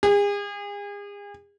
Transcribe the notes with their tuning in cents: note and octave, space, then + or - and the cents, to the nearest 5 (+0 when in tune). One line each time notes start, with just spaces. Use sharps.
G#4 -40